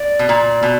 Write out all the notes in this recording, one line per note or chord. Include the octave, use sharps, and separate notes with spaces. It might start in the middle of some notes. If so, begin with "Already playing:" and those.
Already playing: D5
B2
A#2
B2